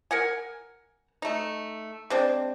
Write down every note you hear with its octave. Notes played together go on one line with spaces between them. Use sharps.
A#4 F#5 G#5
A3 D#4
G#3 C4 D4